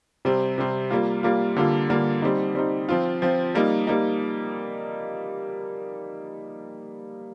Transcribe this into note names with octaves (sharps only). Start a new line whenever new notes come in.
C3 G3 C4
C3 G3 C4
G3 A#3 F4
G3 A#3 F4
D3 G3 A#3 F4
D3 G3 A#3 F4
G3 C4 D#4
G3 C4 D#4
F3 C4 F4
F3 C4 F4
G3 A#3 D#4
G3 A#3 D#4